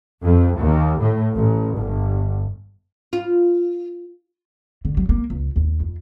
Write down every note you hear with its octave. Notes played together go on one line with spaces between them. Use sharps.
F2
D#2
A2
A1
G1
F4
D3
F#3
A#3
C#2
D#2
F2